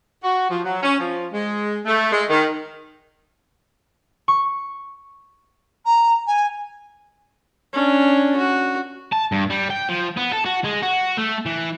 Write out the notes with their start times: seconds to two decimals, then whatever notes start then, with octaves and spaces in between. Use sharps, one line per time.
0.24 F#4
0.50 F3
0.65 F#3
0.83 C#4
1.00 F3
1.33 G#3
1.86 A3
2.12 G#3
2.30 D#3
4.28 C#6
5.85 A#5
6.27 G#5
7.73 C#4 D4
8.37 F#4
9.12 A5
9.32 G2
9.50 G3
9.70 G5
9.89 F3
10.17 B3
10.33 A4
10.46 F#4
10.64 G#3
10.82 F#4
11.17 A3
11.46 E3